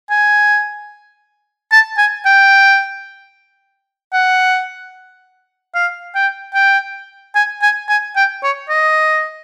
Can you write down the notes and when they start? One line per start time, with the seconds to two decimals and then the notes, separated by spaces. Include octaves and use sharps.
0.10 G#5
1.72 A5
1.98 G#5
2.25 G5
4.13 F#5
5.75 F5
6.15 G5
6.54 G5
7.35 G#5
7.62 G#5
7.89 G#5
8.16 G5
8.43 C#5
8.69 D#5